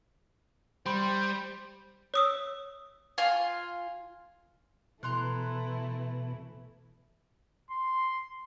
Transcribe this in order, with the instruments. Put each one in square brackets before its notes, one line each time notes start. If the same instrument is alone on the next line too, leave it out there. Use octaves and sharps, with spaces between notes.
[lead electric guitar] G3 [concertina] C5 [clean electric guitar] B5
[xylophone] C#5 D#6 E6
[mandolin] F4 G#5
[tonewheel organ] B2 [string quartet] E3 A3 E4 [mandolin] A#5 C6 F#6
[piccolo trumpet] C6